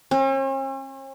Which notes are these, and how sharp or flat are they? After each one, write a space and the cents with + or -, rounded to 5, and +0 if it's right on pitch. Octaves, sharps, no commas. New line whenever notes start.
C#4 -45